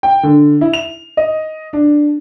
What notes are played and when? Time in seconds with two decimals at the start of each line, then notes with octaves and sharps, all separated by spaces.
0.03 G5
0.23 D3
0.61 E4
0.73 F7
1.17 D#5
1.73 D4